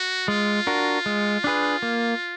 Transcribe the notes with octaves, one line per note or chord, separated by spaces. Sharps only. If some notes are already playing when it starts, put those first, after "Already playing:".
Already playing: F#4
G#3 F4
D4 F#4 A#4
G#3
D4 G#4 B4
A#3